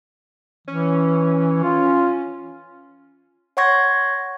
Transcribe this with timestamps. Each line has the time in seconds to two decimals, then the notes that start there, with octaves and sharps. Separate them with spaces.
0.68 E3 C#4
1.63 F4
3.57 C#5 F#5 C6 C#6 G#6 A#6